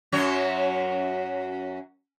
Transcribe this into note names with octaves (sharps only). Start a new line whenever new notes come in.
F#2 F#3 C#5